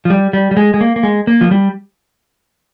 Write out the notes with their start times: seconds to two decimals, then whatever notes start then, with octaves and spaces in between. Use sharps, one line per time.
0.05 F3
0.10 G3
0.33 G3
0.51 G3
0.57 G#3
0.74 G#3
0.81 A#3
0.96 A#3
1.03 G#3
1.27 A#3
1.41 F3
1.51 G3